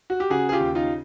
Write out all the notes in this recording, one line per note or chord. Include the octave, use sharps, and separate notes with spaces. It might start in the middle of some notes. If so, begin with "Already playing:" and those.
F#4
G4
C#3 F#4 G#4
G#4
F4 G4
D#2
D#4 F4